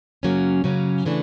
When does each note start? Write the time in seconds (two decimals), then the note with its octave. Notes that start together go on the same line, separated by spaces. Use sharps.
0.23 F#2 C#3 F#3 A#3 C#4
0.64 F#2 C#3 F#3 A#3 C#4
1.05 C#3 E3 A3 D4